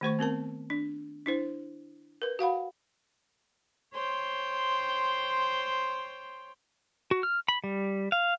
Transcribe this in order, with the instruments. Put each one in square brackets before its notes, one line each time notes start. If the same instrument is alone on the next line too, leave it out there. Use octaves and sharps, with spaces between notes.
[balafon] D#3 A3 C5 C#6
B3 C4 A#4 A5
D4
D4 E4 C5
A#4 B4
F#4 F5 F#5 B5
[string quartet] C5 C#5 G5 C6
[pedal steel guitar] F#4
F6
B5
G3
F5